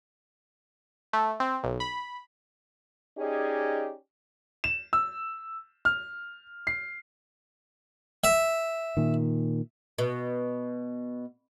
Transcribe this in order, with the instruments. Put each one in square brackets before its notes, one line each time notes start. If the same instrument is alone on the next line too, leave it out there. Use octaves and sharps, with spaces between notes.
[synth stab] A3
C4
B1
B5
[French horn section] C#4 D#4 G4 G#4 D5 D#5
[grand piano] E7
E6
F6
C7
[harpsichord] E5
[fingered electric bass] A#2 D#3
[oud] B2